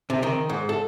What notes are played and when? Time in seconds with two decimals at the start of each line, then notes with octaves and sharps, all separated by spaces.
0.10 C3
0.23 D#3
0.49 G#2
0.69 A4